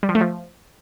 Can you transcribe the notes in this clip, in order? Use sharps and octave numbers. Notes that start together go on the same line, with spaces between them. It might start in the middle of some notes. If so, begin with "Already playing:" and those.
G3
F3
A3
F3